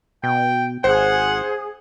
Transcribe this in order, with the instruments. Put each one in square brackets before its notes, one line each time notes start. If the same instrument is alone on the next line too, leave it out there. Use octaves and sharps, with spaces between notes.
[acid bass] B2 [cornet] G5
[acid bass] G#1 [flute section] G#4 [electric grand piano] C5 [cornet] F#5